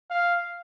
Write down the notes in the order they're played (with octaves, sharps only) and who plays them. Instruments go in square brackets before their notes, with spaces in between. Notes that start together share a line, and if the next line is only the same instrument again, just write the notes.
[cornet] F5